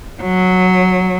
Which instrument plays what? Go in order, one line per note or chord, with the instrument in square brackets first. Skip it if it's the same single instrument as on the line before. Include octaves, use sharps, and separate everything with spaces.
[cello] F#3